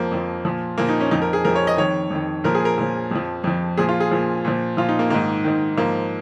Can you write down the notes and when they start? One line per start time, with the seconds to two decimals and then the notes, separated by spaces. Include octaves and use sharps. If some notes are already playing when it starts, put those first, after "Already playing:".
Already playing: F2 F3 A#3
0.11 F2 F3
0.45 A#2 F3
0.78 A#2 F3 A#3
0.89 D#4
1.00 C#4
1.11 F2 F3 D#4
1.22 A#4
1.33 G#4
1.45 F2 F3 A#4
1.55 C#5
1.67 D#5
1.77 F2 D#3 C#5
2.10 F2 D#3
2.44 A#2 F3 A#4
2.55 G#4
2.65 A#4
2.78 A#2 F3
3.11 F2 F3
3.44 F2 F3
3.77 A#2 F3 G#4
3.89 F4
4.00 G#4
4.12 A#2 F3
4.45 A#2 F3
4.77 A#2 F3 F4
4.89 D#4
4.99 A#3
5.10 G#2 D#3 A#3
5.44 G#2 D#3
5.77 G#2 F3 A#3